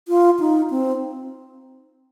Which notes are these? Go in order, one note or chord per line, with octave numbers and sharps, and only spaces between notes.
F4
D#4
C4